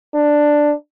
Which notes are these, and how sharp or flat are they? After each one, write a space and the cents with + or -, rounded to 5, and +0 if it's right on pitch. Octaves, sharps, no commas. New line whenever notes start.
D4 +5